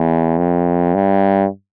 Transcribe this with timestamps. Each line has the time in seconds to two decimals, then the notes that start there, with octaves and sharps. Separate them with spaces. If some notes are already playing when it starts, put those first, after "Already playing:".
Already playing: E2
0.38 F2
0.94 G2